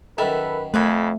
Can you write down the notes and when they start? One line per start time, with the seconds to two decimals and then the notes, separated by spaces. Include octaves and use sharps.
0.18 F#2 D#3 A4 B4 E5 B5
0.74 F2 A3 B4 C5 G#5